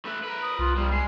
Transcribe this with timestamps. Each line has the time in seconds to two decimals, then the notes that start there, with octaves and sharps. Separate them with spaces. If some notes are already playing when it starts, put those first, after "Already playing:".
0.05 A3 B4
0.24 A#4 B4
0.42 D#6
0.59 C2 F4
0.76 F3 G3 A#3
0.92 G#3 C7